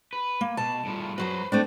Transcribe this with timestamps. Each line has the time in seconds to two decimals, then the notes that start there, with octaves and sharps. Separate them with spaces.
0.13 B4
0.41 A#3
0.57 B2 A5
0.85 A2 G3 F4
1.18 F#2 F#3 F#4 B4 C5
1.52 A3 C4 D4